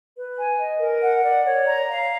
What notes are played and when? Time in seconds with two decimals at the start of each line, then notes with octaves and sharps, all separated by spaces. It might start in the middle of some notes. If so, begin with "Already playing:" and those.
0.16 B4
0.37 G#5
0.59 D#5
0.79 A#4
1.01 F#5
1.22 D5
1.45 C#5
1.66 A#5
1.88 F5